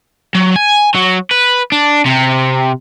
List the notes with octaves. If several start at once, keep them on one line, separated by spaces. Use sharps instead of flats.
F#3
G#5
F#3
B4
D4
C3